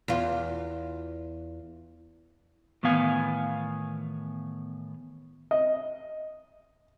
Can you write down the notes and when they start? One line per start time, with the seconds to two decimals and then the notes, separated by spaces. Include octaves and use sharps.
0.08 E2 F4
2.83 A2 D#3 E3 B3 F5 G#5
5.51 D#5